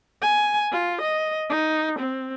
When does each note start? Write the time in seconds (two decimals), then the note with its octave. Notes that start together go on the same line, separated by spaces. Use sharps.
0.22 G#5
0.72 F4
1.02 D#5
1.50 D#4
1.99 C4